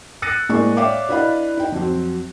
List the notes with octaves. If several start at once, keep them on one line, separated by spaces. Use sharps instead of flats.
E6 F#6 A6 A#6 C#7 D#7
A2 G#3 A#3 D4 C5 C#6
C#5 D5 E5 F5 G5 D6
D4 E4 B4 D#5 F5 B5
D#4 G5
F2 F#3 C4